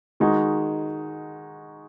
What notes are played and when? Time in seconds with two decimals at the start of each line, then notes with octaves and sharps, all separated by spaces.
0.20 D#3 G#3 D#4 F#4